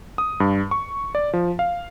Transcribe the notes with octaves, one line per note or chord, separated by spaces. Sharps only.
D#6
G2
C#6
D5
F3
F5